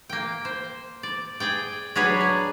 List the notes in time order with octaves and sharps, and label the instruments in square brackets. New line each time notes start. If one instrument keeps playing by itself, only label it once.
[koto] A#3 G5
C5
D5
G#4 D5 G5
F#3 D4 G#4 B4 C#5
G#4